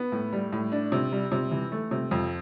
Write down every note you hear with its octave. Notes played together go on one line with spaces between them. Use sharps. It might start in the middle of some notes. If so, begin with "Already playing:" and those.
Already playing: B3
A2
G3
A2
D4
C3
G3
C3
E3
A3
C3
F2